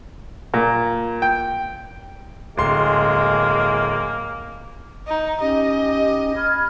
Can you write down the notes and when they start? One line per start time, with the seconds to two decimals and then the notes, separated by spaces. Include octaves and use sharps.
0.54 A#2
1.22 G5
2.58 D1 G#3 A#3 C6
5.07 D#4
5.41 C#4 D#4 G4 D#5
6.36 B5 F6 G#6